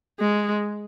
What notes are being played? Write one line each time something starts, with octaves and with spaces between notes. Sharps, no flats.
G#3